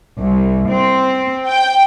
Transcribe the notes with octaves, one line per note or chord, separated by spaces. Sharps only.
C2
C4
G5